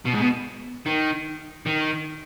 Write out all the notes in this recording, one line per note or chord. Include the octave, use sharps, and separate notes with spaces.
B2
G#2
B2
D#3
D#3